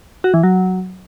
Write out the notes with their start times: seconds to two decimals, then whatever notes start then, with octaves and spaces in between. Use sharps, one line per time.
0.24 F#4
0.34 E3
0.43 F#3